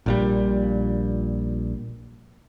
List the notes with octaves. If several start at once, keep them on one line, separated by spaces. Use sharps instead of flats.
A#1 A#2 G3